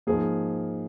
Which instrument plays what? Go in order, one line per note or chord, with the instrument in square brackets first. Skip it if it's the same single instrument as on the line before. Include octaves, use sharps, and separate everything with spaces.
[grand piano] G#2 F3 A#3 G#4